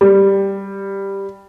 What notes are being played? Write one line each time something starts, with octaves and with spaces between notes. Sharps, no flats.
G3